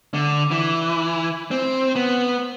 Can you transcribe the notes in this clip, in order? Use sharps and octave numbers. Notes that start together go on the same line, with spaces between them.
D3
E3
C4
B3